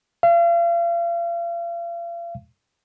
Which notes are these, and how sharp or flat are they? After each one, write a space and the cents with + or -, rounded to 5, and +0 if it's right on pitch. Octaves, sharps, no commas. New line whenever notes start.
F5 -40